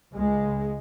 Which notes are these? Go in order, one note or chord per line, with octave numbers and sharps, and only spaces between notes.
C#2 C#3 G#3